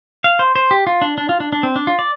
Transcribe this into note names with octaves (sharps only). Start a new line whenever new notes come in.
F5
C5
C5
G4
F4
D4
D4
F4
D4
D4
C4
D4
F4
D5